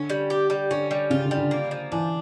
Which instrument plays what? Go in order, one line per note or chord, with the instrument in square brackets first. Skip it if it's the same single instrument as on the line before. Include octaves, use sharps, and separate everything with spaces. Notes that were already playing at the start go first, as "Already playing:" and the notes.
Already playing: [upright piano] D3 [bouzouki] C#4
[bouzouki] G3
G4
G3
[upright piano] D3 [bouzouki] C#4
[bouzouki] G3
[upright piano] C#3 [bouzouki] F4
[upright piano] D3
[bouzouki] G3
[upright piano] D3
[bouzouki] A#3
F3
[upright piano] E3 [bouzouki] D4